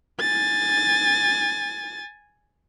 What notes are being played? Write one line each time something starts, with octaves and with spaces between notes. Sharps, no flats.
G#5 A6